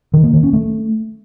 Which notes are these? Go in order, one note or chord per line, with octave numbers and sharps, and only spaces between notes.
D#3
A#3
D#3
C#4
A3